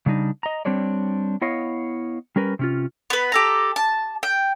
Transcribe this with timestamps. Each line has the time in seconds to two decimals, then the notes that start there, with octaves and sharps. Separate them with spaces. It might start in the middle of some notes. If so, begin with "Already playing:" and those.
0.06 C#3 G3 D4 D#4
0.43 D#5 A#5
0.65 G3 C4 D4 C#5 D5
1.42 B3 E4 C#5 D#5 F5
2.36 G3 C#4 A#4 B4
2.59 C3 C#4 F4
3.10 B3 B4
3.32 G4 A4 A#5
3.76 A5
4.23 G5